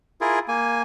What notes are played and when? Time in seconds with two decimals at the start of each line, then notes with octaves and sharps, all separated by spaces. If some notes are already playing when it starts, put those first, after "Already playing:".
0.21 E4 F4 G#4 A#4
0.48 A#3 G#5